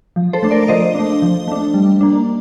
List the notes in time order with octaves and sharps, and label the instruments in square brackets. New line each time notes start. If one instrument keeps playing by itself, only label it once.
[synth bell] F3
A4 C5
A3 D4
A#4 D5
F3 C5 D#5
A3 D4
F3
A3 D4
G3
A#3 D4